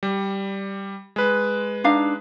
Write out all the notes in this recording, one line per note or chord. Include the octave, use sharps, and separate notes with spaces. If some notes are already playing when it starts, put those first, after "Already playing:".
G3
G#3 B4
D4 D#4 F5